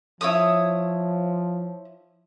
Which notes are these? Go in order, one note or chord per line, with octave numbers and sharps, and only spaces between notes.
F3 E4 C#5 D#6